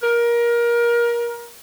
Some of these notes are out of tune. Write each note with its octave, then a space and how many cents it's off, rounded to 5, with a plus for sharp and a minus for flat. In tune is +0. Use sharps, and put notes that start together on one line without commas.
A#4 +25